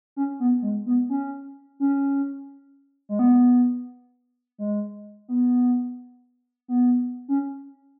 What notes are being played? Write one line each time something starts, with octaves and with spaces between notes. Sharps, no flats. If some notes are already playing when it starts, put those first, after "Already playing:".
C#4
B3
G#3
B3
C#4
C#4
G#3
B3
G#3
B3
B3
C#4